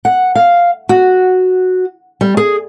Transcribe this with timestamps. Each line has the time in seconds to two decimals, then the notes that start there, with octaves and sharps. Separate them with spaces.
0.05 F#5
0.35 F5
0.89 F#4
2.21 G3
2.37 G#4